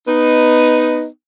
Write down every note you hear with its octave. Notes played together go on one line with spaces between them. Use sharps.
B3 D#4